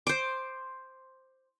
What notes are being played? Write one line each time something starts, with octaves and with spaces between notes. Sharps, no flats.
C5 D6